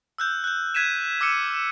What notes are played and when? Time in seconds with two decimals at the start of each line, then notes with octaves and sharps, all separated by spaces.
0.18 E6 F#6 G6
0.44 F#6 G6
0.75 F#6 G#6 B6 D#7 E7
1.21 D6 E6 F6 B6 C#7 D#7